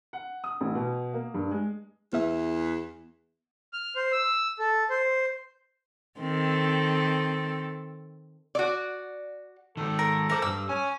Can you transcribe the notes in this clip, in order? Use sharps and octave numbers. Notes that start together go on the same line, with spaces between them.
F#5
D#6
A1
B2
A#3
G2
G#3
E2 B3 E5
F6
C5
E6
A4
C5
D#3 C4 A4
F#4 D5
D#3 G#3 A4
A#4
E3 A#4 C5 D6
G2 G3 E6
C#4 G#5